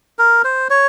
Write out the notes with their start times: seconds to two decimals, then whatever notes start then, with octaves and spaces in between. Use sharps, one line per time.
0.19 A#4
0.44 C5
0.70 C#5